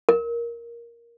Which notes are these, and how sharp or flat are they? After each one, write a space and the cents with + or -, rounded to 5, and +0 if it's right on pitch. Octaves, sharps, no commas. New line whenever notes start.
A#4 +5